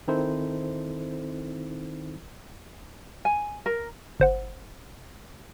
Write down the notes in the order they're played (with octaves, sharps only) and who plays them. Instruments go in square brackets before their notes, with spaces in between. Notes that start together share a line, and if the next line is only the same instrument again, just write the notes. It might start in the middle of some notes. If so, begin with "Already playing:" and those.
[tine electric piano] D#3 C4 D#4 E4 A4 C5
[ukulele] G#5
A#4
[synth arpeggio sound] G1 C5 F#5